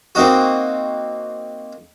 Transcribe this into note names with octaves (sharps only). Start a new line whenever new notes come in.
A#3 C4 D#4 F#4